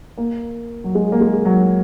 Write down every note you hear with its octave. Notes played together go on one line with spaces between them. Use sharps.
A#3
F#3
G#3
A#3
G#3
F#3